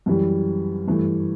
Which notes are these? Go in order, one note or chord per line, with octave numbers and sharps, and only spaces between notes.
F#2 E3 G3
G2 E3 A3